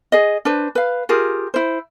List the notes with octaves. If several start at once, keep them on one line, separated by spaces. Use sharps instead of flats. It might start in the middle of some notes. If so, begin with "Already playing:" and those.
G#4 D#5
D4 B4 C5
B4 F5
F4 G4 G#4 A#4
E4 C5